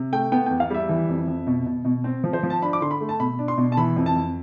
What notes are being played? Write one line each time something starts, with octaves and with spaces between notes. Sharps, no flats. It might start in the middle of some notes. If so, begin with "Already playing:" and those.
Already playing: C3
A3 G5
B3 G5
E2 G5
F5
G3 E5
E3
F2
F2
B2
B2
B2
C4
F3
C5
F3
A5
D4 B5
D6
D3 C6
B5
A3
A5
B2 B5
D4
C6
B2
A5
E3 B5
F2
A5
F2